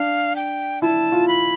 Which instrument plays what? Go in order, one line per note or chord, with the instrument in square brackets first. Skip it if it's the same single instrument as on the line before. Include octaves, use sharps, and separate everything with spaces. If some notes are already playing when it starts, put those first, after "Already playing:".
Already playing: [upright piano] D4 [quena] F5
[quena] G5
[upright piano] E4 [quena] A5
[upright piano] F4
[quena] B5